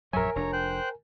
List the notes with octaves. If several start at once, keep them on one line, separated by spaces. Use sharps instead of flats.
A#1 F#2 F#3 A#4 C#5 E5 G#5
F1 D4 C#5 A#5
C5 G5 F#6